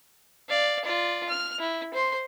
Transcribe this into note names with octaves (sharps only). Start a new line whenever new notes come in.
D5 F5
F4 D5
F6
E4
C5 C6